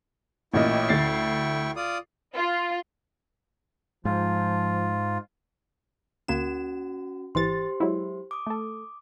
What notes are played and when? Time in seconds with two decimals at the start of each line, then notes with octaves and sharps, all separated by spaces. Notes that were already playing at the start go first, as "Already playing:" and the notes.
0.54 A1 A#2 E4 D#5 G5 C#6
0.89 D2 A6 C7
1.76 F4 D5 D#6
2.35 F4
4.05 G#2 F3 F4
6.28 D2 A#3 C#4 F#4 E7
7.35 G#1 E3 G4 C5 C6 A6
7.80 F#3 G#3 E4
8.31 D6 D#6
8.47 A3 A4